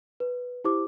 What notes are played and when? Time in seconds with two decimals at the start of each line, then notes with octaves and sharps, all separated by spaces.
0.20 B4
0.64 E4 G4 C5 D6